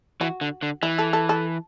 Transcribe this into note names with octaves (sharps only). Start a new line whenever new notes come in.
E3 F#4
D3
D3
E3 E4
A4
A4
A4